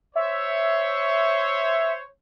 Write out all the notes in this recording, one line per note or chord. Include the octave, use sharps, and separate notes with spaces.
C5 C#5 E5